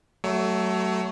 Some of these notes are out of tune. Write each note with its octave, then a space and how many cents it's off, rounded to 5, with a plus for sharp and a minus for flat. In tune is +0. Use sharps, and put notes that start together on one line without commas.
F#3 +25 A3 +0 C#5 +25